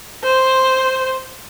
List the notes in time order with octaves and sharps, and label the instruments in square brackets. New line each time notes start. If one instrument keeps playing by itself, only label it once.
[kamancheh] C5